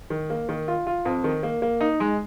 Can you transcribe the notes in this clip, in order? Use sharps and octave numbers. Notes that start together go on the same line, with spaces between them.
D#3
A#3
D#3
F4
F4
F2
D#3
A#3
A#3
D#4
G#3